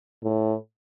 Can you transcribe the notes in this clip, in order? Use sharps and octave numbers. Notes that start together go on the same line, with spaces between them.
A2